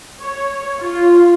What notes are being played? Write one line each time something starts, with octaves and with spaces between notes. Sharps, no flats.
C#5
F4